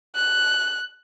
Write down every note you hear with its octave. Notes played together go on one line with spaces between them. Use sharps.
F#6